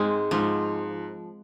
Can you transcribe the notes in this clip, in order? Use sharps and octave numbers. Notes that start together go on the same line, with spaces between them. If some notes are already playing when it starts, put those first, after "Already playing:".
Already playing: G#2 G#3 C4
G#2 F3